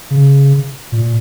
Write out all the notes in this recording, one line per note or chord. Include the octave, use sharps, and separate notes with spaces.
C#3
A#2